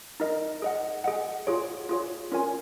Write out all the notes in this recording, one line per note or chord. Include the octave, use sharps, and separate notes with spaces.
D#4 A#4 D#5
G#4 D#5 F#5
G#4 D#5 F#5
F4 G#4 C#5
F4 G#4 C#5
C#4 F4 A#4 C#5 G#5